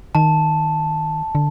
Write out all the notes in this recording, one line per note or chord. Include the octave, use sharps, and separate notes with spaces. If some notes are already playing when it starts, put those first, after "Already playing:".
D#3 A5
D3